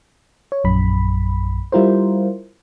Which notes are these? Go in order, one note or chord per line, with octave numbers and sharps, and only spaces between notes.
C#5
A#1 F#2 B5
G3 E4 F4 A#4 C5